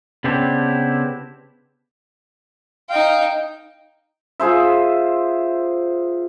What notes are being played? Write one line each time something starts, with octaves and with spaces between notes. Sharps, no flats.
C#3 B3 C4 D4 E4 G4
D#4 F5 G5
F4 G#4 C5 E5